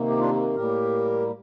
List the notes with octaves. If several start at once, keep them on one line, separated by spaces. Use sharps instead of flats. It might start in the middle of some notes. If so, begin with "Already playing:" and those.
Already playing: C3 D#3 A#3
G4
D4 F4
A2 G3 A#3 G4 A#4